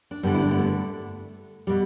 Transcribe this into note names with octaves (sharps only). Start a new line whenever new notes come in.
D4
G2 D3 G3 B3
E4
D4
B3
A3
B2 G3